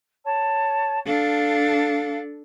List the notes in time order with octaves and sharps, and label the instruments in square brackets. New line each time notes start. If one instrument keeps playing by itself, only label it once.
[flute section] C#5 A5
[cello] D4 A4 [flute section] F5